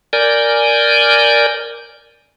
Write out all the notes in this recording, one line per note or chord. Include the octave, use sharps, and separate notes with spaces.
A#4 D5 G#5 G6